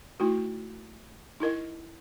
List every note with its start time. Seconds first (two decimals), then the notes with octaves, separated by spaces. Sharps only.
0.20 A3 D#4 E4 F#4
1.40 D#4 E4 A#4 D#5